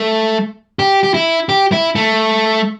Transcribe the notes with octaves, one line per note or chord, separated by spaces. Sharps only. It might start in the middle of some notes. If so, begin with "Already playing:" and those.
Already playing: A3
G4
G4
E4
G4
E4
A3